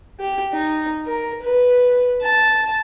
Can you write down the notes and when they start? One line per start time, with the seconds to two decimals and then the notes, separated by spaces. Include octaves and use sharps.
0.20 G4
0.53 D#4
1.07 A#4
1.42 B4
2.22 A5